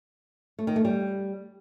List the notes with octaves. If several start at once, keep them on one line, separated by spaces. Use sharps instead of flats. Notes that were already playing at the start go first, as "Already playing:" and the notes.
A3
D#3
A3
G3